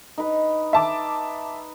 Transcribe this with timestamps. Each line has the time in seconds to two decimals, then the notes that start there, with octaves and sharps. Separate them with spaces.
0.18 D#4 B4
0.73 E5 A5 D6